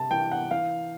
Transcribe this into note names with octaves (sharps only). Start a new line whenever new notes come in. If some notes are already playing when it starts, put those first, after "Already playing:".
Already playing: C3 A5
E3 G5
F#5
E3 F5